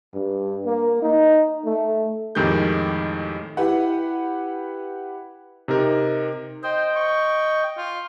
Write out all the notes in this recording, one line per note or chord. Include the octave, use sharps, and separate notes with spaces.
G2
A#3
D#4
A3
F2 A2 D#3 G#3 G4 G6
E4 G4 B4 F#5
C3 D#4 G4 A#4
C5 D#5 G5
C#6
F4